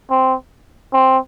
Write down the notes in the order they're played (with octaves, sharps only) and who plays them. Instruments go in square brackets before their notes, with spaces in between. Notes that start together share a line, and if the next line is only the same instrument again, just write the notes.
[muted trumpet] C4
C4